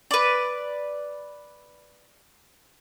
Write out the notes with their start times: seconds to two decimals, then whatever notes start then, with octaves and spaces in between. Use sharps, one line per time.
0.11 B4 D5